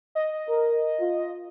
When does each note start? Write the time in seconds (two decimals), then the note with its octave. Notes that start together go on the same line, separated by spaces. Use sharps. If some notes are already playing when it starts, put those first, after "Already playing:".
0.15 D#5
0.47 A#4
0.99 F4